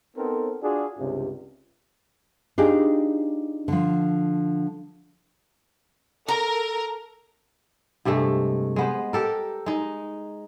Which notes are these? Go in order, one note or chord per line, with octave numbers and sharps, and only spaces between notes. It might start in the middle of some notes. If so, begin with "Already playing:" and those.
B3 C4 D#4 A4 A#4 C5
D4 F4 F#4 G#4
C#2 G2 C3
D4 D#4 F4 G4 G#4
D3 F3
A4 A#4 A#5
G2 C3 G#3 A3
G#3 B3 C5
G4 A4 A#4
G#3 D#4